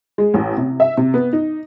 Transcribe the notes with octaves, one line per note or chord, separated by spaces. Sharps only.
G#3
A1
C3
E5
C3
B3
D#4